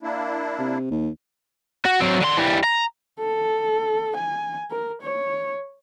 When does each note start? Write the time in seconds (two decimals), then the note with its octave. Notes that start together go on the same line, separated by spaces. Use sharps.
0.03 A#3 D4 E4
0.59 C3
0.90 D#2
1.86 F#4
2.00 F#3 C4
2.20 D3 C6
2.37 E3 G3
2.64 A#5
3.20 A4
4.17 G#5
4.71 A#4
5.02 C#5